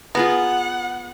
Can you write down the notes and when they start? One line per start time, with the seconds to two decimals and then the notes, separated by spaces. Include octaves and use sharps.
0.15 B3 F4 G#4 F#5 A#5